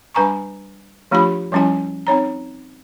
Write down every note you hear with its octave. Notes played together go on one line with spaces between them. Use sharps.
G3 D4 B4 G#5 A#5 C#6
F3 A3 D4 F4 G4 B5
F3 G3 C#4 E4 G#5
C4 D#4 C#5 A#5